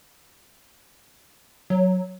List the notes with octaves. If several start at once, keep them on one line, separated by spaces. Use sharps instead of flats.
F#3